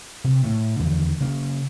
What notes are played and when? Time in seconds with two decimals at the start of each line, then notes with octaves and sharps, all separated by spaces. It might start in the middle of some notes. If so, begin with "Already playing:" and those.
0.24 C3
0.44 A2 A3
0.79 E2 D3 D#3
1.20 C#3 A#3